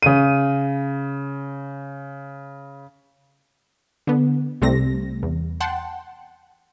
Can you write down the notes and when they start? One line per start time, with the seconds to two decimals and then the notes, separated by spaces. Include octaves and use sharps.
0.03 C#3 D#7
4.07 D3 B3
4.62 C2 C3 G3 A3 C4 A#6
5.23 E2
5.60 F#5 G5 A5 C6